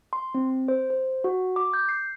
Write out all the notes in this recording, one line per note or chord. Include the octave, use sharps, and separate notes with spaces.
C6
C4
C5
C5
F#4
D6
G6
C7